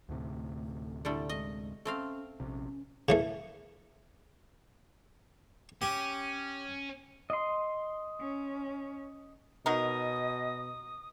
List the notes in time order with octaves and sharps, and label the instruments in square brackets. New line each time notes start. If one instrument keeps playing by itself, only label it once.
[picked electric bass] D2 A2 C3 [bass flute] A3
[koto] D3 G3 A3 [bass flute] E4
[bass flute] G#3 [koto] D#5
[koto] A3 C4 F5 [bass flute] C#4
[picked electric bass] A#1 C3 [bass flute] C#4
[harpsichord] C#3 E3 A3
[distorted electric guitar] C#4 [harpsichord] G4
[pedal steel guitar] D#5 C6
[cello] C#4
[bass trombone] B2 [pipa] F#3 D#4 A#4 [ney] D#5 [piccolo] D#6